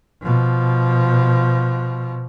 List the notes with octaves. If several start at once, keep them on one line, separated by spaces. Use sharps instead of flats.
B2 F3